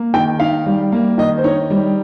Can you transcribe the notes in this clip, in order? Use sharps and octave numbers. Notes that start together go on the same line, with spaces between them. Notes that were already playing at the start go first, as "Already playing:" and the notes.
Already playing: A#3
D#3 G5
D#4 F5
G3
A#3
D#3 D#5
C5
D#4 C#5
G3